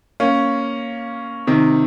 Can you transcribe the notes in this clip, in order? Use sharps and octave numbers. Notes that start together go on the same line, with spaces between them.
A#3 C#4
C3 D#3